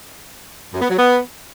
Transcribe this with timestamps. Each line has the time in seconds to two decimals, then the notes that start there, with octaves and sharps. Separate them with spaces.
0.73 F#2
0.82 B3
0.90 F#3
0.98 B3